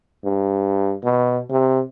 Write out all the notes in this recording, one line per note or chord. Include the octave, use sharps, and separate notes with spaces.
G2
B2
C3